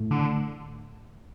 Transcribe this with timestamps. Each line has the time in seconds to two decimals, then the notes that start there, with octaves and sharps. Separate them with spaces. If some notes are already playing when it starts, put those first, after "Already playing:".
Already playing: A2 A3
0.11 D3